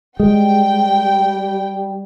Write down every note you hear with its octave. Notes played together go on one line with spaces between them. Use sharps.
G3 G#3 G5